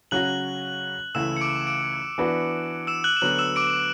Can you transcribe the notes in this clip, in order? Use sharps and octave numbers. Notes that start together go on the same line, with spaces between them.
C#3 F#3 C#4 F#4 F#6 F#7
C#2 C#3 E3 A3 E4 E6 E7
C#7
D6 D7
D6 D7
E3 B3 D4 F#4 B4
E6 E7
F#6 F#7
E7
D2 D3 F#3 B3 F#6 F#7
E6 E7
D6 D7